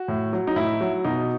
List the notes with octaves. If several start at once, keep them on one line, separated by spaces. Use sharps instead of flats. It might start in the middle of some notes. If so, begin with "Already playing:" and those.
Already playing: F#4
A2
F#3
D#4
A2 E4
F#3
B2 D#4